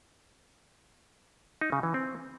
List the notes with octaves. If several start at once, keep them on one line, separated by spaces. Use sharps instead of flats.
D#4
C#3
E3
C4